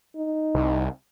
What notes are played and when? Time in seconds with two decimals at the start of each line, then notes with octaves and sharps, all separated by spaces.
0.16 D#4
0.55 C2